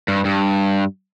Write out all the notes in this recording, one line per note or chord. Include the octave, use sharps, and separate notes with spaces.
G2
G2